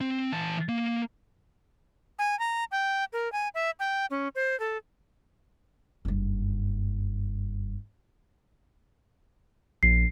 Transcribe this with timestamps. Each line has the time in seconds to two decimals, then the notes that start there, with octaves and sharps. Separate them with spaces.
0.01 C4
0.33 E3 A5
0.69 A#3
2.19 G#5
2.39 A#5
2.71 G5
3.13 A#4
3.32 G#5
3.55 E5
3.80 G5
4.10 C#4
4.35 C5
4.60 A4
6.05 F#1 G2
9.83 A#1 C7